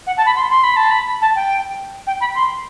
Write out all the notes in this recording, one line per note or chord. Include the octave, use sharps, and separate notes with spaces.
F#5
A5
B5
C6
C6
B5
A5
B5
A5
G5
G5
B5
C6